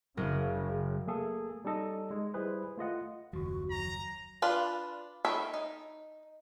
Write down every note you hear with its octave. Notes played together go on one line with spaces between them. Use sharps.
F#1 C#3 A#4
A3 A#3 G#4 A4
G3 C#4 D#4 A4 D#5
G#3
G3 E4 G#4 B4 C5
A3 F4 D#5 F#5
F#1 D#2 F3 F#4
F#3 A#5
D4 F4 B4
D#3 A4 C#5 E5 B5
D#4